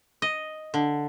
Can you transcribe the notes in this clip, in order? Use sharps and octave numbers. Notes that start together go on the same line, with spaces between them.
D#5
D3